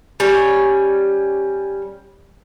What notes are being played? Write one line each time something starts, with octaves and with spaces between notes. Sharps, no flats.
G3 C#4 C#5